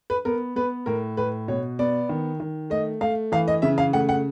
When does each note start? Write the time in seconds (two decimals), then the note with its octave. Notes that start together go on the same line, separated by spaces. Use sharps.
0.10 B4
0.25 B3 A#4
0.56 B3 B4
0.86 A2 A#4
1.17 A2 B4
1.48 B2 C#5
1.79 B3 D5
2.09 D#3
2.40 D#3
2.70 A3 D#5
3.01 A3 F5
3.32 E3 F5
3.48 D#5
3.62 C#3 E5
3.78 F5
3.93 A3 F#5
4.09 F#5